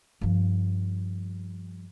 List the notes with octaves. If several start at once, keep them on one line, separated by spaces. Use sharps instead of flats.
G2 F3